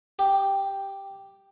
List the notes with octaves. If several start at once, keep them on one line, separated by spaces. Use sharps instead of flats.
G4